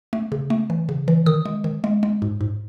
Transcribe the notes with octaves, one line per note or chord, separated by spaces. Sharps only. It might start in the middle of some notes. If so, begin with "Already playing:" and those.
A3
C#3
A3
E3
C#3
E3
D#3 D#6
G#3
D#3
G#3
G#3
G#2
G#2